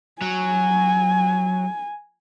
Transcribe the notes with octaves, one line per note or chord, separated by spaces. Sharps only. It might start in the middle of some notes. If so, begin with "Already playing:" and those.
F#3 G#5